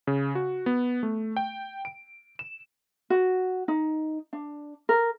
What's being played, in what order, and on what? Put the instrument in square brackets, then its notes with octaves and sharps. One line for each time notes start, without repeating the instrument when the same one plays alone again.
[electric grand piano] C#3
F#4
B3
A3
G5
D7
E7
[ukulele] F#4
D#4
D4
A#4